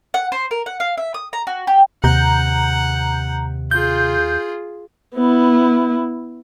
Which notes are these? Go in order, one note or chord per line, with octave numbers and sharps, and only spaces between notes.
F#5
C5
A#4
F#5
F5
E5
D#6
A#5
F#4
G4
D#2 C3 F#5 A#5 G6
F4 G#4 G6
B3 E4